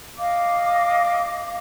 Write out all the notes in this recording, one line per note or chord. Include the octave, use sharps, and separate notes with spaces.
D#5 F5 D6